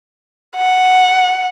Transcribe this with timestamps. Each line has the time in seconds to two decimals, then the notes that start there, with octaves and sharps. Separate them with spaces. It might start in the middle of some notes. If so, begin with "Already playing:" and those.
0.56 F#5